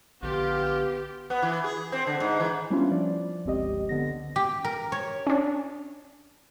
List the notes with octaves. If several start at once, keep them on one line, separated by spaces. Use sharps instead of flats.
A#1 D3 B3 F4 G4
B3
E3
G#4
C4
D3
G#2
E3
G3 B3 C#4 D4 E4 F4
F3 D5
G1 C#2 C4 G4 D#5
D3 B3 A#6
G4
A#4
C#5
C#4 D4